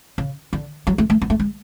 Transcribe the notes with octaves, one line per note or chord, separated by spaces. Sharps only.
C#3
D3
F#3
A3
A3
B3
A3
G#3